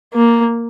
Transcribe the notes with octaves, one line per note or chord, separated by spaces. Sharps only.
A#3